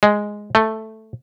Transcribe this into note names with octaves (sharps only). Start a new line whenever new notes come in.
G#3
A3